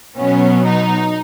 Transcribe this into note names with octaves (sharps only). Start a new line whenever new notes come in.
B2 F#3 B3 C#4
D#4